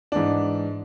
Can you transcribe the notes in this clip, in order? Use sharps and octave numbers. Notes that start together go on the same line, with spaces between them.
G#2 E3 D4